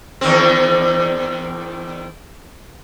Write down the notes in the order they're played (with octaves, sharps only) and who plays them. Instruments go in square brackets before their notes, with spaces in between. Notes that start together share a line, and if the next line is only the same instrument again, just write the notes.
[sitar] E2 D#3 C4